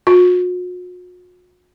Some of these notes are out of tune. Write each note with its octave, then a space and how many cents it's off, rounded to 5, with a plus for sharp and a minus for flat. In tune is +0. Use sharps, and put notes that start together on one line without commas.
F#4 -45